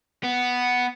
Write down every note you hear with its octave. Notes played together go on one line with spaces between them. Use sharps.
B3